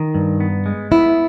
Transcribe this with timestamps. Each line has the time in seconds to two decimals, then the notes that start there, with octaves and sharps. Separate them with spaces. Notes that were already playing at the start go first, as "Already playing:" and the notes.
Already playing: D#3
0.15 G2
0.40 B3
0.66 G#3
0.91 B3 E4